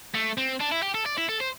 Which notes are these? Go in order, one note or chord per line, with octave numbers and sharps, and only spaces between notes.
A3
C4
D4
E4
G4
A4
D5
E4
A4
C5